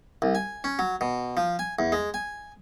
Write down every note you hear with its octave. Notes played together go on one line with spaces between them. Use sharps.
C2
G#5
C#4
F#3
B2
F3
G#5
E2
G#3
G#5